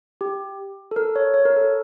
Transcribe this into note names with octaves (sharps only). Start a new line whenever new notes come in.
G4
A4
A#4
C#5
C#5
A#4
A4